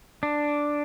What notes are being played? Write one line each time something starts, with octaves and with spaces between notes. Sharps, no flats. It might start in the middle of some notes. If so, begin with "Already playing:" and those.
D4